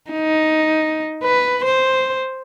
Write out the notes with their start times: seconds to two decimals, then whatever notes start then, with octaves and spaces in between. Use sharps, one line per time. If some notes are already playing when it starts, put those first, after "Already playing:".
0.11 D#4
1.23 B4
1.64 C5